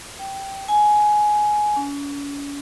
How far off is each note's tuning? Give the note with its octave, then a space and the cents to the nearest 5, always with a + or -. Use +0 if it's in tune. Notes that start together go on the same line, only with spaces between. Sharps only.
G5 -5
G#5 +15
C#4 +40